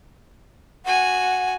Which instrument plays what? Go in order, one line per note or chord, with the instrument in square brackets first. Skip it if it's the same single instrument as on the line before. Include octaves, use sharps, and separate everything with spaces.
[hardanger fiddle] F#4 G#5 [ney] F#5